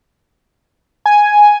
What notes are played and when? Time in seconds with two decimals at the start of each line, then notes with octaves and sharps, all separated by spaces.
1.06 G#5